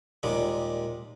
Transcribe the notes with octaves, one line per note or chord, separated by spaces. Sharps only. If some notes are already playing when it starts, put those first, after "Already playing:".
D#2 A#2 G3 G#3